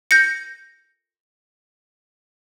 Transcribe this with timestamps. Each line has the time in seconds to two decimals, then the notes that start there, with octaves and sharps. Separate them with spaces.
0.11 G6 A#6 C#7